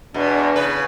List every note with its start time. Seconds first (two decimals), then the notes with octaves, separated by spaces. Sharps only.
0.14 E2 B2 D4
0.56 C#3 B4